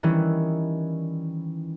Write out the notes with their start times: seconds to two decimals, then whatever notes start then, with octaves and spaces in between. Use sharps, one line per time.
0.03 D#3 E3 G3 C#4 E4